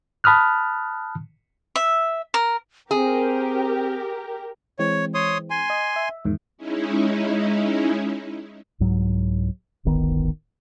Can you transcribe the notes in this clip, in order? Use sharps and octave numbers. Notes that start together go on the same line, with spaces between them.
A5 B5 D#6 F6 F#6
E5
A#4
C4 G4 G#4 A#4
E3 G#3 C4 C#5
C#5 C6 D#6
G#5 C6
D#5
E5
E2 G#2 D#3
G#3 C#4 D#4 E4
C2 G#2 F#3
D1 G1 D#3 B3